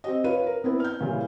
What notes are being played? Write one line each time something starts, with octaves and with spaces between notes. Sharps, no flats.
C4 G4 D#5
F4 B4 C#5 D#7
A#4
B3 C4 E4 B4
F6 G6
A#2 C#3 E3 G3